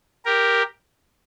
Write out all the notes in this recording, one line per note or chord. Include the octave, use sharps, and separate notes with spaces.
G4 A#4